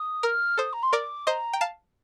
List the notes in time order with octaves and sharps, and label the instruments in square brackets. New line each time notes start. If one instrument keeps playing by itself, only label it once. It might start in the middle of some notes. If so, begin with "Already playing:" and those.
Already playing: [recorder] D#6
[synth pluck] A#4 [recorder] F6
[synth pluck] A4 C5 [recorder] D#6
[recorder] A#5
C6
[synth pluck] A#4 D5 [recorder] D6
[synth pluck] C5 D#5 [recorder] A#5
[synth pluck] G5
F5 A5